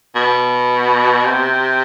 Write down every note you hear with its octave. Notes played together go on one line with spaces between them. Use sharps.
B2
C3